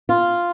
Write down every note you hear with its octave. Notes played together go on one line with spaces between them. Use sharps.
F4